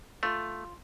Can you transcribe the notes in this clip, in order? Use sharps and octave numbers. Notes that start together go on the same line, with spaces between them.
A3 F4